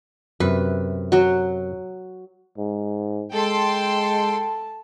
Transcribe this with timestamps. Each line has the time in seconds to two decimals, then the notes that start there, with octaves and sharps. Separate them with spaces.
0.40 F#2 C3 B4
1.12 F#3 F#4
2.58 G#2
3.33 G#3 A4 G5 A5 C6